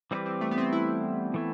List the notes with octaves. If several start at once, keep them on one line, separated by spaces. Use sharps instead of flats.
E3 G3 C4 D#4 G4 B4
C4
A3
B3
C4
E4
E3 A3 E4